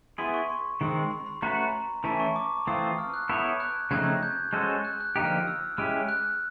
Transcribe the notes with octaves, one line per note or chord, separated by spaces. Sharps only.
B3 E4 G#4 C6
C#6
C6
D#3 G#3 C4 C6
B5
B5
A3 C#4 F#4 B4 A#5
E3 A3 C#4 E4 A5
C#6
D6
E3 A3 C4 F4 D#6
F6
F#6
B3 E4 A4 C#5 G6
F#6 G#6
C#3 F3 A3 C4 D#4 F#6 G#6
G6
G#3 C#4 F#4 A4 C5
F#6
F#6
D3 F3 A#3 D#4 G4 F#6
F6
E6
G#3 C#4 E4 G4 F6
F#6